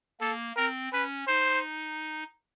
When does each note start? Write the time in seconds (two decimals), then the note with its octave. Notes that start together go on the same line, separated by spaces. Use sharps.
0.20 A#3 A4
0.56 C4 A#4
0.92 C#4 B4
1.27 D#4 C5